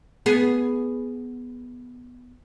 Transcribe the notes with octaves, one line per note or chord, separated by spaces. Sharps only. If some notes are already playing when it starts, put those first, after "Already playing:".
B3 G#4